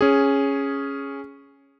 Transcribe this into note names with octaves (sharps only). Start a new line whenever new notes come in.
C#4 G#4